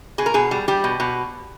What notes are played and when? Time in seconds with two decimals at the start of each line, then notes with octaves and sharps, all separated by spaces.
0.18 B2 G#4
0.26 A#4
0.34 B2 G#4
0.51 G3
0.68 G3 G4
0.84 B2
1.00 B2